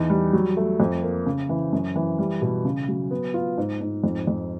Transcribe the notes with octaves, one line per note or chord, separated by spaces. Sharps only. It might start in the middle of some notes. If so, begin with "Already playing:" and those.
Already playing: E2 D#4
G3
F#3
A3
F2
A#3
C#3
E3
F#2
E3
G3
B2
C#3
F#3
B3
F4
G#2
G#2
F2
F2